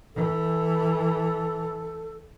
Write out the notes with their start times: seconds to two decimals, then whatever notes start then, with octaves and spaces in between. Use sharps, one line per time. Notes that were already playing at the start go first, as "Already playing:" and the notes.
0.15 E3 A4